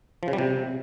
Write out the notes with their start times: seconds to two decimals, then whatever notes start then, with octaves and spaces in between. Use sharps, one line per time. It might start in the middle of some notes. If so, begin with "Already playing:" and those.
0.23 F3
0.28 C#3
0.33 G3
0.38 C3